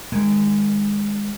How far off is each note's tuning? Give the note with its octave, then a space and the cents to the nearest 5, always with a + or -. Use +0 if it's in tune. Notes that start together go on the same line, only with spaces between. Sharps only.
D#3 +0 G#3 -15